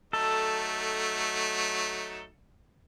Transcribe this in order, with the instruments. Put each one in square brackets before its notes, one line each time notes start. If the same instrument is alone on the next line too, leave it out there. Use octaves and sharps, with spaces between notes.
[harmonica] F#3 A3 D#4 [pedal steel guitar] A4